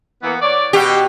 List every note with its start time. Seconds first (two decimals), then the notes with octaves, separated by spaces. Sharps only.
0.23 E3 A#3 B3
0.42 C#5 D5
0.73 B2 G4